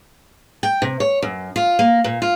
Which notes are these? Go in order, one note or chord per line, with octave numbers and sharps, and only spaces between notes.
G5
C3
C#5
F#2
F4
A#3
A#2
F4